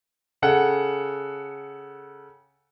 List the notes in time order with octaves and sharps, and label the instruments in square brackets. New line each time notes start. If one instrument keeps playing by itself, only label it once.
[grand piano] C#3 A4 F#5 G5